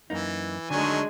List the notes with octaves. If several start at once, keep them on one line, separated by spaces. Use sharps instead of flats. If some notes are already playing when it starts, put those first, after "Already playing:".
F#2 E3 A#3 D#4
D3 D#3 F#3 G#3 A3 D4 G#5